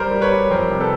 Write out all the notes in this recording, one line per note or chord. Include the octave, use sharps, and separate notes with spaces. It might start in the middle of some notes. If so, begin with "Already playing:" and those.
Already playing: G3 A#4 C5
G3
B4 C#5
G3
F2 A#4 C5
C3
A4 B4